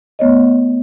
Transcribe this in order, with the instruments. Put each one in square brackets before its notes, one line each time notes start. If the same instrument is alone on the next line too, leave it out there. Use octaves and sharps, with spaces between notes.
[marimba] A3 B3 C#5 D#5